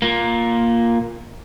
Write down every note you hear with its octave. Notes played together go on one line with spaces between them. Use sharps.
A#2 A#3